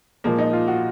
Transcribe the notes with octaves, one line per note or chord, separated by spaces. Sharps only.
A#2 F3 G#3 A#3
D#4
F4
F#4